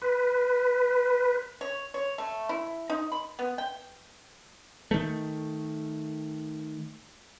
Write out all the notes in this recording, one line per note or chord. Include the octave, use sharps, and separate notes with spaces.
B4
C#5
C#5
A3
E4
D#4
B5
B3
G5
D#3 A3